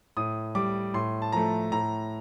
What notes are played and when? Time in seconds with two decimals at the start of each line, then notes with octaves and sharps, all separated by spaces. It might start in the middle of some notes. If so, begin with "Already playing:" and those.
0.17 A2 D#6
0.55 G3 D6
0.94 A2 C6
1.22 A5
1.32 F3 A3 A#5
1.72 A2 A#5